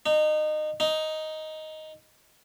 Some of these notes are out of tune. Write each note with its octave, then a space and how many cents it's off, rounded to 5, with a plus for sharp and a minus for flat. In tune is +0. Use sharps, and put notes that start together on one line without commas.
D#4 -25
D#4 +5